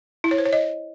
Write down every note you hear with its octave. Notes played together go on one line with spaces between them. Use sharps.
E4
C#5
C5
C#5
D#5